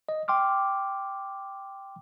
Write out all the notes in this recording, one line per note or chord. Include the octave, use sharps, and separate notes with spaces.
D#5
G5 C6 D6 F6